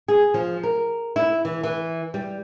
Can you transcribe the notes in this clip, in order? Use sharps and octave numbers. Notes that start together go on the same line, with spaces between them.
G#4
F3
A#4
E4
E3
E3
G3